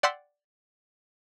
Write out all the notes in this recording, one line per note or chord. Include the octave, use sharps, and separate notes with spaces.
D5 F#5 G5 C6 E6 B6